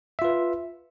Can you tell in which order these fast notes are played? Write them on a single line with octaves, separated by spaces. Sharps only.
E5 F4 B4